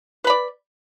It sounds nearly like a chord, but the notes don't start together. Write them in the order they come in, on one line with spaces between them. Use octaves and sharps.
B4 B5 D5